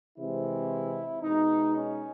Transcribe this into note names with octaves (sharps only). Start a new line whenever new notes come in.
C3 E3 G#3 C4 E4
B2 G#3 B3 D#4
C#4